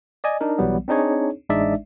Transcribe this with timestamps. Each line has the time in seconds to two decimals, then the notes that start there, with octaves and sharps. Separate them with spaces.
0.24 D5 D#5 G#5
0.41 D4 D#4 A#4
0.58 B1 E3 F#3 G3 B3
0.88 C4 D4 D#4 G#4 C#5
1.49 A1 G#3 D4 D#4 D5 E5